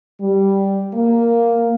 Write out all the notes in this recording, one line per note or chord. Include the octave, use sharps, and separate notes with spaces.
G3
A#3